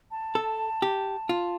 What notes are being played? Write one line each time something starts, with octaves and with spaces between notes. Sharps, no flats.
A5
A4
G4
F4